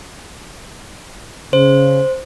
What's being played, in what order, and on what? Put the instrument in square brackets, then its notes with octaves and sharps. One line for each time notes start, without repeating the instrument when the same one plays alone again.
[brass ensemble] C#3 [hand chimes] C5